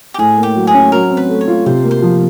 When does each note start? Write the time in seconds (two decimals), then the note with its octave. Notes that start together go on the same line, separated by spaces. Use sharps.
0.14 G4
0.18 A2 G#4
0.38 A#3
0.43 G4
0.55 F#3
0.67 G#4
0.74 C#4
0.92 F#3 A#4
1.10 C4
1.17 B4
1.29 A3
1.41 C#5
1.47 F4
1.66 C3 C5
1.84 A#3
1.91 C5
2.02 F3